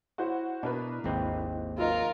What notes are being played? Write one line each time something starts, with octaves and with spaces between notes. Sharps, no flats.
E4 F#4 C5 C#5
B2 D4 A#4 B4
G#1 D#2 C4
F#3 D#4 F4 A#4